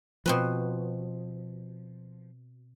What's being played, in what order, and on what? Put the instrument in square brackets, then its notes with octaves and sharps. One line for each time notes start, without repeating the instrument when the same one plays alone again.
[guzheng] B2 C4 B4 [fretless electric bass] F3